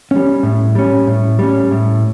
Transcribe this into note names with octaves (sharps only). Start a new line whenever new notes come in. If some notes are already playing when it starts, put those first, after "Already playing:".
G3 C#4
A2
G3 C#4
A2
G3 C#4
A2